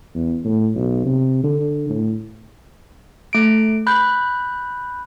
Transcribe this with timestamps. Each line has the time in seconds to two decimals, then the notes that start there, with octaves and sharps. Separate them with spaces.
0.15 E2
0.44 A2
0.75 B1
1.05 C3
1.43 D3
1.90 A2
3.33 A3 D7
3.87 B5 F#6 G6